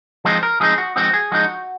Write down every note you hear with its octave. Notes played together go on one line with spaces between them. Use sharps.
F3 G#3 C4 D#4 C5
A#4
F3 G#3 C4 D#4 G#4
F#4
F3 G#3 C4 D#4 F#4
G#4
F3 G#3 C4 D#4 F#4